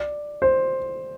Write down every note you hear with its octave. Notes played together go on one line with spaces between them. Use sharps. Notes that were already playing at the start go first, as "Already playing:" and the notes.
Already playing: D5
C5